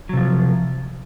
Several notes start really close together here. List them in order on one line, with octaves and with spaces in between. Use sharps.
F#3 C3 F3